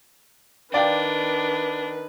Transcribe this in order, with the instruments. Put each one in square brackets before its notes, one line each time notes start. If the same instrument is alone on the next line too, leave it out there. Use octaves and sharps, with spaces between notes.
[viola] D#3 B4 [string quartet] D4 [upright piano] D5 F5 G5